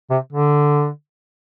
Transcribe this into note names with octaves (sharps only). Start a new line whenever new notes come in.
C3
D3